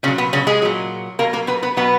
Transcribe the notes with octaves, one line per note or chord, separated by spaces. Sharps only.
A#2 C#3 F#3 C#4
B3
C#3 C#4
G#3 G#4
A#2 F#3
B2 F#3 A#3 A#4
A#3 A#4
B3 B4
B3 B4
B2 F#3 B3 B4